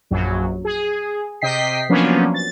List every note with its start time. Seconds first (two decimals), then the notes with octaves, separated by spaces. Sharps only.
0.11 A#1 F#2 F#3
0.65 G#4
1.41 C3 D#5 G5 B6 C7
1.89 F3 F#3 A#3 B3 C#4 D4
2.34 A6